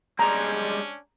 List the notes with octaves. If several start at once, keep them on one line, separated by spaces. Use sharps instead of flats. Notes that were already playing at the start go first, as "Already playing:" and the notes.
G3 G#3 C#4 D4 G#5 A#5